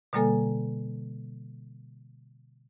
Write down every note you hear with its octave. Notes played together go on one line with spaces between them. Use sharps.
B2 D3 G3 A#3 A4 G#5